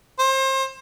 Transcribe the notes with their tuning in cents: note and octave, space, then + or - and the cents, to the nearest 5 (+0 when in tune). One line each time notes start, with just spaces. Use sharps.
C5 +30